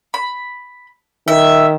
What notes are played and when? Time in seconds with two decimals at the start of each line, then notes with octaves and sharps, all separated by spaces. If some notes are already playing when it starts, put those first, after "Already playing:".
0.14 B5
1.28 D#3 E5